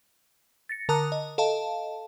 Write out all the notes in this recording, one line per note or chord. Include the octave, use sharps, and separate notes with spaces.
A6 A#6 C#7
D3 A#4 A5 A#5 D#6 F#6
D#5
A4 D#5 F5 A5